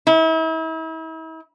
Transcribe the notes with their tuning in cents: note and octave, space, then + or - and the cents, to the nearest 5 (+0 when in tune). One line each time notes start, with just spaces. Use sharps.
E4 -40